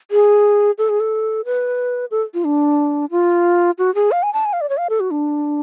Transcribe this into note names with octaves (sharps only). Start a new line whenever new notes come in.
G#4
A4
G#4
A4
B4
A4
F4
D4
F4
F#4
G#4
F5
G#5
A5
G#5
F5
D5
C#5
F5
A4
F#4
D4